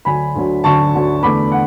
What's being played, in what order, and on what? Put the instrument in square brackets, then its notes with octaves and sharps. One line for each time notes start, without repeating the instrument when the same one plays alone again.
[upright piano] D2 D3 F#3 G#5 B5
D2 D3 F#3
D2 D3 F#3 A5 C#6
D2 D3 F#3
E2 D3 A3 B5 D6
F#5